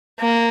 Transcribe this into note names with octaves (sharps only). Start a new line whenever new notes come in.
A#3